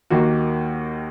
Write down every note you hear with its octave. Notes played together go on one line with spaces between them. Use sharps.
D#2 D#3 A#3 F#4